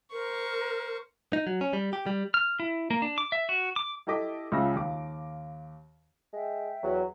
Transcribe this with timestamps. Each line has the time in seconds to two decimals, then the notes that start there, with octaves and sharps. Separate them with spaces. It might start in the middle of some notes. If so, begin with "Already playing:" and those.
0.12 A#4 C5 C#6
1.33 D#4
1.47 F#3
1.61 C#4
1.73 G3
1.93 G4
2.06 G3
2.34 F6
2.60 E4
2.90 A#3
3.02 D4
3.18 D6
3.32 E5
3.49 F#4
3.76 D6
4.07 E4 G4 A4 D#5 D6 B6
4.52 C#2 C#3 F4 E5 E6 A#6
4.76 D#2 F5 D6
6.33 G#3 E5 G5
6.83 E2 F#3